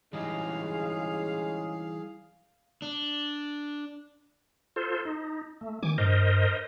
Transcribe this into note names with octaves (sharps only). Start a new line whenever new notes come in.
E3 G3 G#3 C#4 D#4 G#4 F5
D4
F4 A4 C5
D#4
A3
D#3 G#5 D6
G2 A#4 C5 D#5